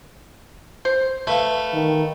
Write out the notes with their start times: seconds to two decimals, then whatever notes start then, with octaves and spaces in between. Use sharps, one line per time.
0.85 C5
1.27 A3 B4 F5
1.74 D#3